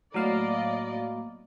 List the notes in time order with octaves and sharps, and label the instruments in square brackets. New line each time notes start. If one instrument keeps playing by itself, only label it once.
[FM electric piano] A2 F#3 F5 [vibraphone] A#3 B3 [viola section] D5 D#5